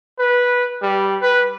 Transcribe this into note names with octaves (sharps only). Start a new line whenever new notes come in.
B4
G3
B4